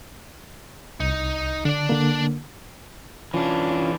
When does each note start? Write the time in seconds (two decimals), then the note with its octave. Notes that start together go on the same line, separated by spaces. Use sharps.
1.00 C2 D#4
1.65 D3 D4 D5
1.89 D3 A#3
3.34 E3 C#4 D4 F4